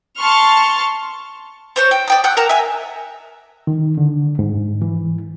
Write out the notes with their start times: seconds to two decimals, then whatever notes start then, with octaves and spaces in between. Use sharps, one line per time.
0.18 A5 C6 C#6 F6
1.76 C4 C5 C#5
1.91 G5
2.08 D5 G5 D#6
2.24 F#5 G5 E6 F#6
2.37 A#4 A5 A#5
2.49 E5 G#5
3.67 D#3
3.98 D3
4.39 G#2
4.82 E3